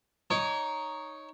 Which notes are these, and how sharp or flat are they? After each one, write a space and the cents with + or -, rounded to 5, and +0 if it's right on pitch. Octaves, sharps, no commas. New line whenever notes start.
D#4 +0 C#5 +0 D6 -45